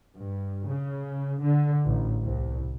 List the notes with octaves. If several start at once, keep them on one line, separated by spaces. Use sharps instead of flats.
G2
C#3
D3
A1
C2